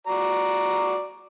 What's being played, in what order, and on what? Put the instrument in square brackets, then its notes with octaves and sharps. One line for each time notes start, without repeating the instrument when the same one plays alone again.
[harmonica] F#4 D5 A#5